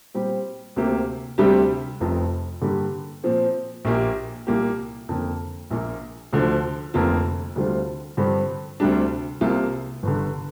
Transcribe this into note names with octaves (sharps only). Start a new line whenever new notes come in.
A#2 G3 C4 G4
D2 C3 A#3 G4
D2 C3 G3 D4 G4
F1 F2 F3
G2 D3 A#3 G4
A#2 F3 C4
A#1 A#2 A#3 G4
C2 A#2 A#3 G4
F2 D3 A#3
A#1 A#2 A#3
D2 D3 F3
F1 F2 D3 A#3 F4
D2 D3 G3 C4 F4
G2 D3 F3 C4 G4
D2 C3 G3 D4
C2 C3 A#3 F4
G1 G2 D3